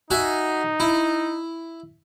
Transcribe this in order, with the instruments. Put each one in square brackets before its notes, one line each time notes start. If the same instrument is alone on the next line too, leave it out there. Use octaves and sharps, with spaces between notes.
[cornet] D#4 [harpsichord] F#4 E5 G#5
[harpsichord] E4